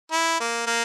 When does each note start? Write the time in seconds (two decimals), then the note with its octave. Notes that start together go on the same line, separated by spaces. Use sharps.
0.12 E4
0.40 A#3
0.67 A#3